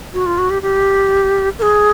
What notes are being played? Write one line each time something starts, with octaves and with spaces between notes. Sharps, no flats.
F#4
F4
F#4
G4
G4
A#4
G#4